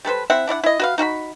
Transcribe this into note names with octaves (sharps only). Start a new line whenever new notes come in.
G3 A4 B4 C5
C4 E4 E5 F#5
D4 E4 D5 F#5
E4 D#5
F#4 B4 F5
D#4 F#4 F5 B5